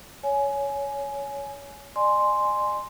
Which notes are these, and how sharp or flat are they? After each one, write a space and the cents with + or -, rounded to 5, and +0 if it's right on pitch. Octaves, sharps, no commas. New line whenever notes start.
C#5 +15 G#5 +15
D5 +45 G#5 +5 C6 +0